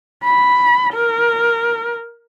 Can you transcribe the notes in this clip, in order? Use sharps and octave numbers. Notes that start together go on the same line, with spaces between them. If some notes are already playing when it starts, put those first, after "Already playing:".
B5
A#4